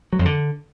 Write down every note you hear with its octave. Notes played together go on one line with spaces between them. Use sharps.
F#3
F2
D3